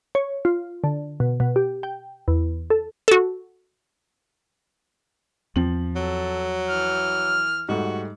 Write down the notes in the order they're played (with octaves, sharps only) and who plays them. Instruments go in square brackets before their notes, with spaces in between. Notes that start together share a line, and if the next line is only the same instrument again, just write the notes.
[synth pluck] C#5
F4
D3
B2
B2
G4
G5
E2
A4
[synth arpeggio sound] F#4 A4
[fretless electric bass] E2 C4 [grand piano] F3 F#7
[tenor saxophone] F#3 [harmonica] A4
[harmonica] E3 F6
[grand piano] G#2 G3 A3 [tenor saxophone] F#4